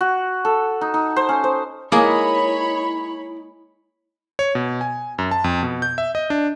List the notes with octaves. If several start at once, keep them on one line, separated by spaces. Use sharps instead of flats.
F#4
A4
D#4
D#4
C5
C#4
C5
G#3 A#3 D#4 E4 G#4 C#5 D#5 B5
C#5
B2
G#5
F#2
A5
F2
B2
G6
E5
D#5
D4